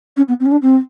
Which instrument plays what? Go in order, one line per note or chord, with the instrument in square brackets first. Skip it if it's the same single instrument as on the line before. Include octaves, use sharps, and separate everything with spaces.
[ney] C#4
B3
C4
C#4
D4
C4